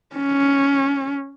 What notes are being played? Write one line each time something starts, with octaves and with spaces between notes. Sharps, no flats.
C#4